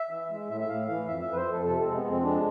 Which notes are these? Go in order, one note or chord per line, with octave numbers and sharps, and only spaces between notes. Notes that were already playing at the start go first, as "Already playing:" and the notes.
Already playing: E5
E3
G#3
A2 E5
E5
A2 F5
E3 F5
F2 E5
E5
F2 B4
C5
F2
A4
C3 A4
C4
G#3
B3
F2
C4
G#3 D4